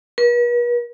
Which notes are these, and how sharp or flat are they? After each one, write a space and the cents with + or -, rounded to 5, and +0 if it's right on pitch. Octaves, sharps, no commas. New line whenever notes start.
B4 -45